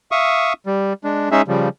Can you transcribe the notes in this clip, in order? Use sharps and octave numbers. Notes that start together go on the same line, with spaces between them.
E5 F5 C#6 D#6
G3
G#3 D4
G#3 C#4 D#4 G#4 E5
C#3 F3 G3